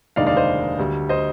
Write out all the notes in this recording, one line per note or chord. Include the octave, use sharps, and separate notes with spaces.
F1 D#2 D3 G#3 D#4 D5 F5
D5 F5
C5 D#5
D2 D3 G3
C5 D#5